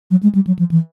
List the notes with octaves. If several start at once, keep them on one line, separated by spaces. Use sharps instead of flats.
F#3
G#3
G3
F#3
F3
E3